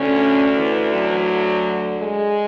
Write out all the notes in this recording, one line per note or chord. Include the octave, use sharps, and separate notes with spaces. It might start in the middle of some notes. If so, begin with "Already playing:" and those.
Already playing: D2 D3 C#4
E3
F#3
G#3